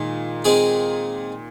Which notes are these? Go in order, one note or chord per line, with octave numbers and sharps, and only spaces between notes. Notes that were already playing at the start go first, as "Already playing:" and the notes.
Already playing: A#2 D#3 G#3
G#3 C4 G#4